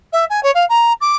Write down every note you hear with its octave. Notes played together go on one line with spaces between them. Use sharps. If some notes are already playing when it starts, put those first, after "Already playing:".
E5
G#5
C#5
F5
A#5
D6